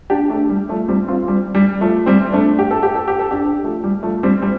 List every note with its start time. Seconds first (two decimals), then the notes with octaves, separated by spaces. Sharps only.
0.10 D4 G4
0.29 A3 D4
0.49 G3
0.69 F3 A3
0.88 G3 C4
1.08 C4 F4
1.28 G3
1.55 G3
1.81 F3 A3
2.06 G3 C4
2.32 A3 D4
2.59 G4
2.71 A4
2.83 G4
2.95 A4
3.08 G4
3.19 A4
3.31 D4 G4
3.64 F3 A3
3.84 G3
4.03 F3 A3
4.23 G3 C4
4.42 G3